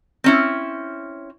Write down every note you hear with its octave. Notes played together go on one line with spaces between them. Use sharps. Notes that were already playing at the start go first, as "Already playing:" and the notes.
C4 C#4 E4